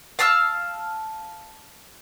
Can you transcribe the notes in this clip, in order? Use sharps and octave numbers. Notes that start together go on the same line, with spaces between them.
F5 A5 E6 F6